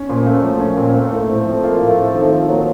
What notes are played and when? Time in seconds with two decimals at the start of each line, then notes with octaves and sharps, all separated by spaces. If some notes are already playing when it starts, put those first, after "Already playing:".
Already playing: C#4
0.09 A#2 F3
0.26 F3 A3
0.42 F3 F#3
0.60 A#3 C#4
0.77 A#2 C4
0.94 A3 A#3
1.05 A#3
1.11 A2 A3
1.29 C4
1.45 F3
1.63 A#3 F4
1.80 A2
1.88 A3
1.97 C4
2.14 D#3 F3
2.31 F3 F4
2.48 F#3 A#3